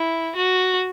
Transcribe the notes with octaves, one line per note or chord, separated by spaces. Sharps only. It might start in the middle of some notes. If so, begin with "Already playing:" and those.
Already playing: E4
F#4